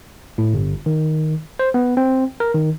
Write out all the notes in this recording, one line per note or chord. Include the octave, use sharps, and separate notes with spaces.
A2
G1
D#3
C5
B3
C4
A#4
D#3